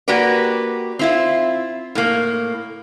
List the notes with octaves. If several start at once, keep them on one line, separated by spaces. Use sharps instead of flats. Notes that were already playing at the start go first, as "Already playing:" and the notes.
A#3 F#4 G4 B4 D5
C4 E4 F4
A2 A#3